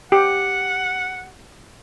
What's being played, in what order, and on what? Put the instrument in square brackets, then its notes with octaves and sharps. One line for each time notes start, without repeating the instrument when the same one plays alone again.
[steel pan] G4 [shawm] F#5